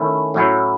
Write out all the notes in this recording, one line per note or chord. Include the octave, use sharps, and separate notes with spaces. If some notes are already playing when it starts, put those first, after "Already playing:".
Already playing: D#3 A3 C#4 E4
A2 F#3 C#4 E4